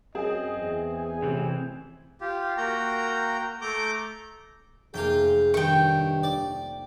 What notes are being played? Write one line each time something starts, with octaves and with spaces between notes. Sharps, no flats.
F#2 C4 G#4 D#5
E2
G#5
A1 C3 E3 C4
F4 G4
A#3 F#4 G5 A#5
A3 A#5 D6 G6
F1 A#3 F4 G#4 G5
G2 D#3 G5 C#6
D5